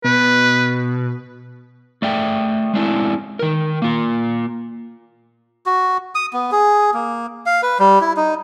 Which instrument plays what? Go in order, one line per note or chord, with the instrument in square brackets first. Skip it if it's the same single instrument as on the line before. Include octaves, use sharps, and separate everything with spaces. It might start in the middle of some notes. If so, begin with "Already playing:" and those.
[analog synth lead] B2 [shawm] B4
[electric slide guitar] A3 D5 E5 G5
G#3 C4 D4 E4
D#3 A#4
A#3 F4
[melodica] F#4
D#6
B3
G#4
A#3
F5
B4
G3
E4
D#4